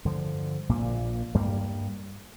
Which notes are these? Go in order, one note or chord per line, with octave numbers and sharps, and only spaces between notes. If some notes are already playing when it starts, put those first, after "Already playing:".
G2 D3 F3
A#1 A#2 A#3
G2 G3 A#3